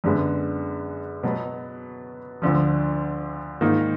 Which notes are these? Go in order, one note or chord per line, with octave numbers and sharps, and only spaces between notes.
F#2 D3 G#3 B3 D4
B2 F#3 B3
D2 D3 F3
G#2 D#3 A#3 D#4